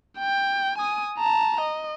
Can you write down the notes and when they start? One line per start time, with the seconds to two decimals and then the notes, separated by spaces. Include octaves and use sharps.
0.18 G5
0.78 G#5 D#6
1.18 A5 A#5
1.61 D#5